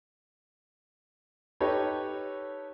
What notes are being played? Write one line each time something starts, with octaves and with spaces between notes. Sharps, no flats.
D#4 G4 A4 B4 C#5